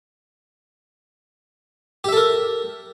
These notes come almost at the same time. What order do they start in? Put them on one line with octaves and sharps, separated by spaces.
G4 E5 A4 A#4